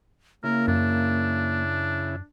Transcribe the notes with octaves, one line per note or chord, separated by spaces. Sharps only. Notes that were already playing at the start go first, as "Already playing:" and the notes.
C#3 A#3 E4 A#4
F#2 D4